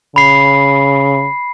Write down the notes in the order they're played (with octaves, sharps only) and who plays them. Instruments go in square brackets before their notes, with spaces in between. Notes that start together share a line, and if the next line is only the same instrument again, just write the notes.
[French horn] C#3 [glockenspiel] B5 C7